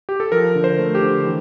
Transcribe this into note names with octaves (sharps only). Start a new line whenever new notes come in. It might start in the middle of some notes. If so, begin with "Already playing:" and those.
G4
A4
F3 A#4
D3
C5
A3
G4
D3
E3